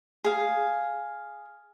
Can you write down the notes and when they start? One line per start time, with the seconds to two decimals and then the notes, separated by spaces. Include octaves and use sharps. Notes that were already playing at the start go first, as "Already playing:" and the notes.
0.24 G#4 F5